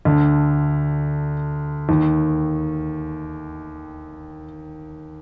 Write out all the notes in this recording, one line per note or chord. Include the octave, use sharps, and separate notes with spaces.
D2 D3
D#2 D#3